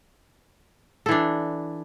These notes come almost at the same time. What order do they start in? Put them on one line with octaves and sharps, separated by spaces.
A4 E3 D4